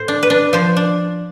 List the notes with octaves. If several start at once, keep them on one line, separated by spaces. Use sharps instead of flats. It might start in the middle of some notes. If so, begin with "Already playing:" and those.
Already playing: A2 A4 C5
D4
B4
D4
F3 C5
D4